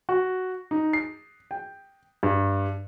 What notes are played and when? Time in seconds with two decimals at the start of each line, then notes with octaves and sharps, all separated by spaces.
0.09 F#4
0.71 D#4
0.93 C7
1.51 G5
2.23 G2